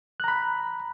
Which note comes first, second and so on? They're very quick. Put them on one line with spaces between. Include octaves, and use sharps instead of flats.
F#6 A#5 B5